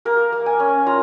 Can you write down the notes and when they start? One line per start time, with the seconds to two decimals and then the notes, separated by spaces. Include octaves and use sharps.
0.05 A#3 A#4
0.32 A#3
0.46 G#5
0.60 C#4
0.87 F4 A#5